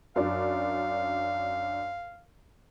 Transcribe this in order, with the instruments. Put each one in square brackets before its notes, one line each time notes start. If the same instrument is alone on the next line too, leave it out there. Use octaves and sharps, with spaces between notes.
[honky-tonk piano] F#2 D4 [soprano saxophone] F5